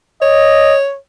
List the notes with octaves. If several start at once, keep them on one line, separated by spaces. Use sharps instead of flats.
C#5 D#5